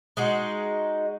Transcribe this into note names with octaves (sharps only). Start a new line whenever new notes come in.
G#3 D#4 F#4